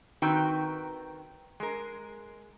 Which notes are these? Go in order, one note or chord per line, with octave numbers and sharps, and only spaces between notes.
D#3 C4 D#4 F#4 B4 G5
G#3 A#4